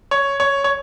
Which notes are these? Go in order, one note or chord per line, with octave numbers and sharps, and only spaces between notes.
C#5
C#5
C#5